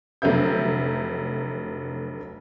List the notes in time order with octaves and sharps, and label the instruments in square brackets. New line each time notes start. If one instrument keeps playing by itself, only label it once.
[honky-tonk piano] F1 D3 F#3 E5 G6